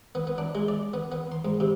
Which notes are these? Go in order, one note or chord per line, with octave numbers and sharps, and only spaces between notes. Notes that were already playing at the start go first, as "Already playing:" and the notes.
B3
B3
D4
G#3
D5
B3
B3
C6
G#2
C3